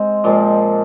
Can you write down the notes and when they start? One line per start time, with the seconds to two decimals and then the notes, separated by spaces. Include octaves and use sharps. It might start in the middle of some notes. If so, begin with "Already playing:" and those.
Already playing: G#3 C4
0.24 A#2 F3 G#3 C4